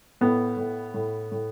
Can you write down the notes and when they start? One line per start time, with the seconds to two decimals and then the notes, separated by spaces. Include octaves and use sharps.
0.21 A2 B3
0.57 A2
0.94 A2
1.32 A2